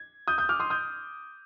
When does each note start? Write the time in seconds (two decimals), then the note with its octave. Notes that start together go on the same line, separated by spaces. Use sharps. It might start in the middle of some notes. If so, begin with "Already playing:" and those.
Already playing: G#6
0.28 D#6 G6
0.38 D#6 G6
0.49 D6 F6
0.60 C6 D#6
0.70 D#6 G6